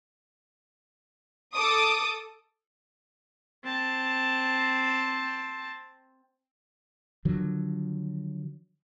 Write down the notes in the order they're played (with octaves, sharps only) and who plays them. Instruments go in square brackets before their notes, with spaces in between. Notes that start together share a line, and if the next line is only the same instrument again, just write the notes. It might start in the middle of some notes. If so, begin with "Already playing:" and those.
[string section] A4 D6 D#6
[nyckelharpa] C4 A5
[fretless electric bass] D3 D#3 F3 F#3